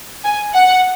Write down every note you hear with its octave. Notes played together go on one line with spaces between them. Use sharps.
G#5
F#5